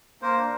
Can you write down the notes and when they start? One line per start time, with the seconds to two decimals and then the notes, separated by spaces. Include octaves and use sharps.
0.22 A#3 A#4 C5
0.37 D4